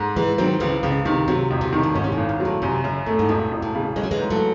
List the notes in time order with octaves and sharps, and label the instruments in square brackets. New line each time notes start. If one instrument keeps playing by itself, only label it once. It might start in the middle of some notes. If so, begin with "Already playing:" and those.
Already playing: [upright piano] G#2
[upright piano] G#2 [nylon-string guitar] E3 G#3
[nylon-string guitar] D#3 F#3 [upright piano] C4
[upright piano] C#2 [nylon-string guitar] C#3 E3
[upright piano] C#2 [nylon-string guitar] C#3
[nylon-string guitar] C3 [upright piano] D#3
[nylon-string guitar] C3 [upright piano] F#3
[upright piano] E1
[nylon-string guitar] C3
[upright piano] D#3
[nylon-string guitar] A2
[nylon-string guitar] G#2 [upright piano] C#4
[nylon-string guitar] C3
A2
[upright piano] G#1
[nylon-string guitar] G#2
[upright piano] F#3
[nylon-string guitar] A2
[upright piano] F#2 [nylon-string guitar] C3
[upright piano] F#2 [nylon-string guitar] C#3
[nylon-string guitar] A2 [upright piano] A3
[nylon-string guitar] G#2
[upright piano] E1 [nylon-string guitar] A2
[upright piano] E1
[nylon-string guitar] A2
[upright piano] C#3
[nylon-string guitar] G#3 [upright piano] C#4
[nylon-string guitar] F#3
E3 G#3
[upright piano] G#2
[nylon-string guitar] F#3 A3